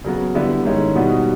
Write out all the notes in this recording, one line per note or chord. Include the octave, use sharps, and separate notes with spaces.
C#3 F#3 B3
D3 G3 B3 E4
G#2 D#3 G#3 C#4 E4
B2 G3 B3 D#4 F#4